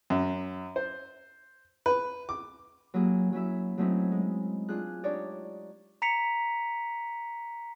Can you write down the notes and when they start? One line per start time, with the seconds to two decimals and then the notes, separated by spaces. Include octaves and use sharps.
0.10 F#2
0.76 C5
1.86 B4
2.29 D6
2.94 F#3 A#3 E4 G4 G#4
3.33 F#3 C#4 E4 E5
3.78 F#3 A3 C4 C#4 D#4 E4
4.12 G#3
4.69 D4 F4 G#4 F#6
5.04 D4 D#4 G4 C#5 D5
6.02 A#5 B6 C#7 F7